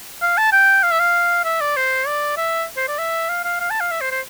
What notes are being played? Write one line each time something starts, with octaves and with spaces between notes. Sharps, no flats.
F5
A5
G5
F5
E5
F5
E5
D5
C5
D5
E5
C5
D5
E5
F5
F5
F5
A5
F5
E5
C5
C5